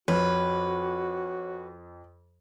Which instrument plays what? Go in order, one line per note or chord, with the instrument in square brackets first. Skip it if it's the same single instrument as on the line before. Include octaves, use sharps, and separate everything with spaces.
[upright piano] F2 [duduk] F#4 [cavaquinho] B4 [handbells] C#5 F6